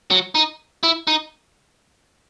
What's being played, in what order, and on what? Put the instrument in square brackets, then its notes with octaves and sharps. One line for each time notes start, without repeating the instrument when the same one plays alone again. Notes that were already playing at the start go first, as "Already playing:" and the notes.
[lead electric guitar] F#3
D#4
E4
D#4